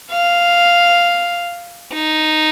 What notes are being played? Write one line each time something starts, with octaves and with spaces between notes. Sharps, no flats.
F5
D#4